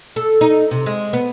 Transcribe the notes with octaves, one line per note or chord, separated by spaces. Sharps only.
A4
D#4
C3
G#3
B3